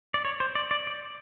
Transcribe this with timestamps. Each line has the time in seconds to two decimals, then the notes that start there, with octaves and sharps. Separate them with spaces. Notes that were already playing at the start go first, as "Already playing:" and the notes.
0.14 D5
0.25 C#5
0.40 C5
0.55 D5
0.71 D5
0.87 D5